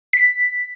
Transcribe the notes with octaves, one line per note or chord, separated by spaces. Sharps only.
B6